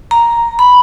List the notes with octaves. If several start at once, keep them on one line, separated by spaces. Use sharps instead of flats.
A#5
B5